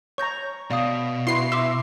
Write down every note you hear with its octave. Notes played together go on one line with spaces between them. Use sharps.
C#5 A#5 C#6 G6 A#6
B2 D5 F5 D#6
E4 F#4 B4 C6 C7
E5 C6 D6